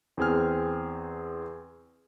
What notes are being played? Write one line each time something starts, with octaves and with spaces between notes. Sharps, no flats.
E2 C4 G#4 G#5 F6